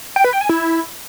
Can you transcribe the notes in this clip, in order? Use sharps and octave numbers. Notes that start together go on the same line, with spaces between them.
G5
B4
G5
G#5
E4